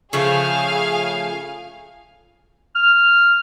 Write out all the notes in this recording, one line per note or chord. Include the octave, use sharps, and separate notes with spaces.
C#3 F3 A3 G#4 F5 G#5
F6